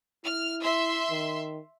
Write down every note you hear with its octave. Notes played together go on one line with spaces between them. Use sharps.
E4 F6
E5 C6
D#3